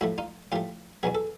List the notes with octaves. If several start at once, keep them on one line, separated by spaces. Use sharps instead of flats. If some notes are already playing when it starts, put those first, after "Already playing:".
A2 F3 A3 E4 F#4
D#4 F4
A2 F3 A3 F4 G4
E2 B2 F#3 B3 G#4
A4